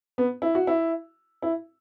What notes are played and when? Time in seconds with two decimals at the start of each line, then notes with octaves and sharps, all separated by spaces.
0.18 B3
0.42 E4
0.55 F#4
0.67 E4
1.42 E4